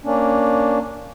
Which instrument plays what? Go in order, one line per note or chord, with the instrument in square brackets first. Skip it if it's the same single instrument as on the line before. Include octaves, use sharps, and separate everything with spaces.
[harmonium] A#3 C#4 D4